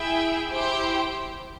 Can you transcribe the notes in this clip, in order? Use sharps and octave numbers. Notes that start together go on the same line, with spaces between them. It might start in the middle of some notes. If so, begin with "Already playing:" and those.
Already playing: E4 G#4 E5 G5
E4 G4 C5 G5